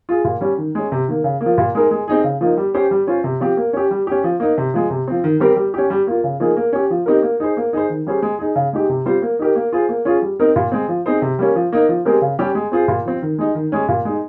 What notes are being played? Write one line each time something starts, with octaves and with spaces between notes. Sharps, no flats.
F4 G#4
A#2
G3 C#4
D#3
G#3 C#4
C3
D#3 A#3
C#3
A#3
F3
A#2
G#3 D#4 A#4
G#3
C4 D#4 G#4
C#3
F3 A#3 D#4
G3
C#4 G4 C5
G3
C#4 F4 C5
C3
F3 C4 G4
A#3
C#4 G4
G3
C#4 G4
F3
A#3 D#4
C3
F3 G#3
C3
F3 C4
D#3
G3 C4 G4 A#4
G3
C#4 G4
G3
A#3 F4
C#3
F3 A#3 D#4 G#4
A#3
C#4 G4
F3
C4 D#4 G4 A#4
A#3
D#4 G#4 C5
A#3
D#4 G#4 C5
D#3
G3 C#4 G#4 C5
G#3
D#4 G#4
C#3
G#3 D#4 G4
C3
G3 C4 F4 C5
A#3
D#4 G4 A#4
A#3
F4 G#4 C5
A#3
C#4 F4 G#4
G3
C4 D#4 A#4
A#2
G#3 C4
F3
C4 D#4 G#4 C5
C3
G3 A#3 C#4
F3
A#3 D#4
F3
G#3 C4 G4 A#4
C#3
G3 C#4 G4
G#3
C4 F4 G#4 C5
A#2
F3 C4
D#3
G#3 D#4
D#3
G#3 C#4
A#2
G#3 D#4